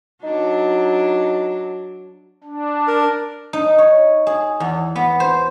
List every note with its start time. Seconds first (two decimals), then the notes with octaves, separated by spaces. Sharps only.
0.24 F#3 D4 D#4
2.44 D4
2.88 A#4
3.53 D#4
3.78 C#5
4.27 G#4
4.60 E2
4.96 B3
5.20 C5